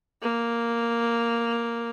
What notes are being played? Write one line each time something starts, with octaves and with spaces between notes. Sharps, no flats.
A#3